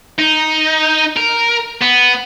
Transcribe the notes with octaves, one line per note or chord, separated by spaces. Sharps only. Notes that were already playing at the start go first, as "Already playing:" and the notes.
D#4
A#4
B3